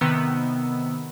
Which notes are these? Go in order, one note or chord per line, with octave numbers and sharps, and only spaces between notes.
C3 D#3 B3 E6